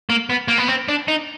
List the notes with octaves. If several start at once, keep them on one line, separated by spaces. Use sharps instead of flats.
A#3
B3
A#3
B3
C4
D4
D#4